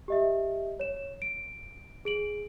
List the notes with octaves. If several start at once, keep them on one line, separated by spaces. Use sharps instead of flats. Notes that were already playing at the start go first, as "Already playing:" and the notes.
G4 D#5 E5
C#5 E7
D7
G#4 D7 F#7